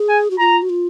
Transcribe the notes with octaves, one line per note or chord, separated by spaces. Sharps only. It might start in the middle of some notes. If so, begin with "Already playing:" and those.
Already playing: G#4
G#5
F#4
F4 A#5
F#4
F4